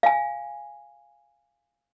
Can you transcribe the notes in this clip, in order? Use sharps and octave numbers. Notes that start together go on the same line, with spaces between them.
F5 G#5